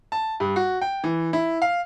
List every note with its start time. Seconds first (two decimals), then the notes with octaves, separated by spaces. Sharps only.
0.12 A5
0.40 G2
0.56 F#4
0.81 G5
1.04 E3
1.33 E4
1.62 F5